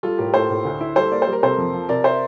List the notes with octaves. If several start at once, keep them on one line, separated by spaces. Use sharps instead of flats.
G3 F4 A4
A2 G4 A#4
A2 A4 C5
A2
D2
E4
G3 A4 C5
A#3 D5
C5
G3
A#4
C3 A4 C5
F2
F3
C3 A#4 D5
C5 E5